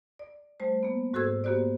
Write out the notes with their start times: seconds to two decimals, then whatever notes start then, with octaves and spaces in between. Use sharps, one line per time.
0.19 D5
0.60 G3 A3 C5
0.83 A#3 B3
1.14 G#2 F#4 A4 C5 E6 G#6
1.44 A#3 B3 F#4 G4 C5 D5